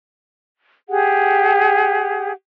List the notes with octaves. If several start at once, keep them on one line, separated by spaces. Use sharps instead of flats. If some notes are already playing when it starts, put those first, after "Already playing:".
G4 G#4 F#5